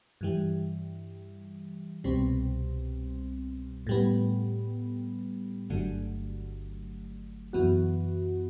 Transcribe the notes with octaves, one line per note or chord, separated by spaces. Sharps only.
G2 E3 G3
C2 B2 G3 C4
A2 G3 B3
G1 G2 D3 F#3 A3
F#2 E3 B3 F#4